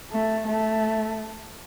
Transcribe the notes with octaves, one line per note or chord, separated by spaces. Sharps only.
A3
A3